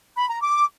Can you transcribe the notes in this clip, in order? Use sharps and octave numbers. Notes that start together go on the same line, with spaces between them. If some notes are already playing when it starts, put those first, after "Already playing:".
B5
A#5
D6